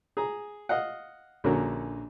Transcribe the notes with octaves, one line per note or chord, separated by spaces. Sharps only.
G#4 A#5
D#5 F5 F#5
A#1 D3 A#3 C#4 F#4 A#4